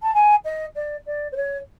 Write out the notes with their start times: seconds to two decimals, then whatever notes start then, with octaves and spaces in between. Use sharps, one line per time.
0.02 A5
0.14 G#5
0.44 D#5
0.75 D5
1.06 D5
1.32 C5
1.36 C#5